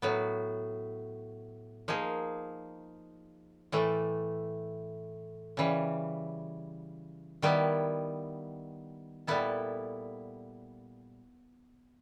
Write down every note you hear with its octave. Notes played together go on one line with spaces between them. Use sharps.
A2 F#3 B3
F3 A#3 D#4 G#4
A2 E3 A3
C#3 E3 G3
D#3 G3 B3 E4
A#2 G3 B3 E4 A4